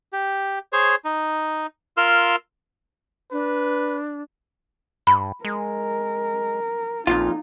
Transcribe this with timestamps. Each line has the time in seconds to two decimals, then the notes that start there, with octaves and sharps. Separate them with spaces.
0.13 G4
0.73 G#4 C5 C#5
1.05 D#4
1.97 F4 A#4 C6 E6 F6
3.32 D4 B4
5.07 G2 B5
5.45 G#3 A#4
7.07 A#1 F2 A#2 D#4 F4